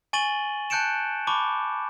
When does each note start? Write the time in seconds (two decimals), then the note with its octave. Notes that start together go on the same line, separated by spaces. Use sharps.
0.13 G#5 C#6 A6 D#7 F#7 G7
0.70 A5 F#6 G6 C#7 D7 E7
1.27 A5 B5 C#6 D6